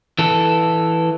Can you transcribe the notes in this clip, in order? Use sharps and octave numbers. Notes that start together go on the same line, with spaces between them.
E3 A4